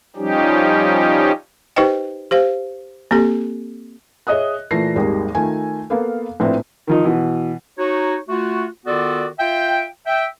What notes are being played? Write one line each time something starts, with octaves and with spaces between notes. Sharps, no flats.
F3 G3 C#4 D#4 G4
D#4 G4 B4 C5 D#5 G5
G4 C5 F5
A#3 C4 G4 A4
G#4 C#5 D#5 E5 D#6 F#6
A#2 E3 A3 A#6 C7
G#1 D#2 D#3 G3 G#4
D#3 A3 F4 G#5
A#3 B3 A4 F5
A#1 A2 C4 E4 B4
D#3 F3 D#4
B2 E3
D#4 F#4 C#5
A3 F4 F#4
D#3 B3 F4 F#4 A4 D5
F4 E5 F5 G5
E5 G5